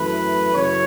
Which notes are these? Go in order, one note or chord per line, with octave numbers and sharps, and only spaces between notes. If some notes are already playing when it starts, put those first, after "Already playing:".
Already playing: F#2 E3 A3 B4
F#2 C#3 E3 A3 C#5